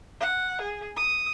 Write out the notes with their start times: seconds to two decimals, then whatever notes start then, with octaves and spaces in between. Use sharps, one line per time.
0.20 F#5
0.62 G#4
0.97 D#6